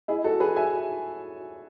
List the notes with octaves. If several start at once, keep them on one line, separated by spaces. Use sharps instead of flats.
E4 G#4
F#4 A4
G#4 B4
E5 G#5